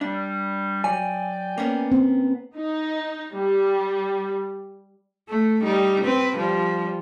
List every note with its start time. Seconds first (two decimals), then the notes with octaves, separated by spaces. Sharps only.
0.01 G3 D4
0.84 F#3 D5 G5 G#5
1.58 A#3 B3 C#4
1.92 C4
2.56 D#4
3.36 G3
5.29 A3
5.63 G3 D#4
6.04 C4 B4
6.37 F3 G3